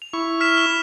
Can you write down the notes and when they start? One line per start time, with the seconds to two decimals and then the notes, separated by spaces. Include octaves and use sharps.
0.02 F7
0.13 E4 C#6
0.41 F6 B6 E7
0.57 G7